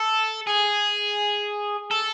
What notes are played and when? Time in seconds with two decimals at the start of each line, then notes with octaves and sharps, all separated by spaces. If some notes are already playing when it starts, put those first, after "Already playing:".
Already playing: A4
0.47 G#4
1.91 A4